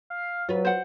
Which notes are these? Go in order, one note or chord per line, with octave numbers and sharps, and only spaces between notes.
F5
F#3 F4 B4
C5 F#5